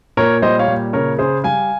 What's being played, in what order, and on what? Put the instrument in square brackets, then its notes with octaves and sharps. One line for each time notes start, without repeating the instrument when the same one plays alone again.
[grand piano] A#2 A#4 C#5
G3 C5 D#5
C#5 F5
A#2
C#3 A#4 C#5
C#3 G#4 C5
G3 F5 G#5